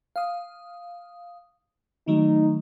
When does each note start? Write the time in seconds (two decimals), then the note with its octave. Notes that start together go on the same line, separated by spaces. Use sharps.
0.16 F5 D#6
2.08 D#3 F#3 A3 D#4